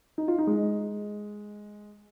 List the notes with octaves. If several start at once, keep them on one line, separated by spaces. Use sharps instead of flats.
D#4
F4
D#4
G#3